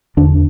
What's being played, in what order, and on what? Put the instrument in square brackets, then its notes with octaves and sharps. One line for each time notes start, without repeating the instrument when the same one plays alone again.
[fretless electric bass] E2 D3 D4